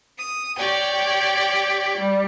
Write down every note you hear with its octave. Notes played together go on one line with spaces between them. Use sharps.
D#6
G4 C#5 D5 G5
G3